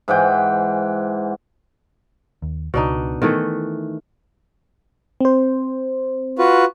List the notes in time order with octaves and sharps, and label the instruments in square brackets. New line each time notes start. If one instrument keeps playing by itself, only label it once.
[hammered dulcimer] G#2 E3 F#5 G5
[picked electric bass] D#2
[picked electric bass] C#2 [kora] B2 D4 D#4
[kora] D#3 E3 A3 [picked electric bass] B3
[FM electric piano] C4 C5
[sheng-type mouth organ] F4 F#4 B4